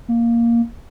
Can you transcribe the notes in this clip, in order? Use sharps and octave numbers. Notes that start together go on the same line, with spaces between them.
A#3